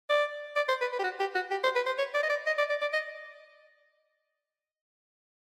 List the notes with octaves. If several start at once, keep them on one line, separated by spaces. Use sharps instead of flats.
D5
D5
C5
B4
B4
G4
F#4
G4
F#4
G4
C5
B4
C5
C#5
D5
D#5
D5
D#5
D5
D5
D5
D#5